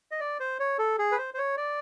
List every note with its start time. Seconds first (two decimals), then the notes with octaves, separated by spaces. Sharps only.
0.11 D#5
0.20 D5
0.40 C5
0.60 C#5
0.79 A4
0.99 G#4
1.12 B4
1.18 C5
1.34 C5
1.38 C#5
1.57 D5